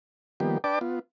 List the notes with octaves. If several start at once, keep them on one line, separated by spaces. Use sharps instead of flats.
D#3 F3 G3 A#3 B3 G4
D4 B4 D5 G5 A5 D6
B3 F4